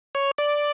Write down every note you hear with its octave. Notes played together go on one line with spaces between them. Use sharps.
C#5
D5